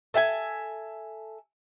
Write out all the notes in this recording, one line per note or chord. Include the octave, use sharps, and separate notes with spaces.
A4 E5 G5 G#5